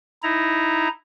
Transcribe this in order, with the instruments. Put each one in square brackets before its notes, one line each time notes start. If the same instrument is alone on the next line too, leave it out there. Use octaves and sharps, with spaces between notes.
[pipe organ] D#4 E4 A#5